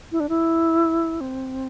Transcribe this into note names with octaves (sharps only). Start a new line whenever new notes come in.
E4
D4
E4
C4